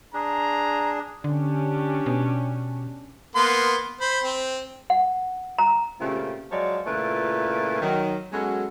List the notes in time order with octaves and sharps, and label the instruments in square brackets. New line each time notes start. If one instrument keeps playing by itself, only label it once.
[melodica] D4 G#4 [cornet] A#5
[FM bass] D3 [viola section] C#4 D4 G4
[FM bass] B2
[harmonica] A#3 B3 C6
C5 B5
C4
[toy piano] F#5
A#5
[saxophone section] A#2 C#3 A3 C4 F4 G4
F3 F#3 G#3 C#5 D5
A#2 C#3 A3 E4 F4 B4
D#3 F#3
F#3 G#3 B3 C#4 F#4 A4